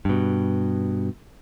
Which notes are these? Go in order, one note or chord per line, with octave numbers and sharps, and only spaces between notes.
G2 B2